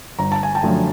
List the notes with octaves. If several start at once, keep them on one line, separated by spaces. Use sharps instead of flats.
G1 A#5
A5
G#5
G5 A5
F#2 D3 F3 A3